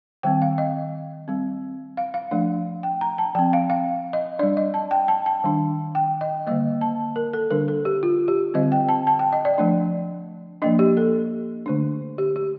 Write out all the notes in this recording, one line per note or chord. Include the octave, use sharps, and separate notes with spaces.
D#3 G3 C4 G5
F5
D#5
G3 C4
F5
F5
F3 A3 D4
G5
A#5
A5
F3 C4 G5
F5
F5
D#5
G3 D4 D5
D#5
A5
G5
A5
A5
D#3 G3 D4
G5
D#5
D3 G3 A#3 D#5
A5
A#4
A4
D3 G3 D4 A#4
A4
G4
F4
G4
D3 G3 C4 D#5
G5
A5
A5
G5
D#5
D5
F3 A3 D4
F3 A#3 D4 D#5
G4
A4
D3 A3 D4
G4
G4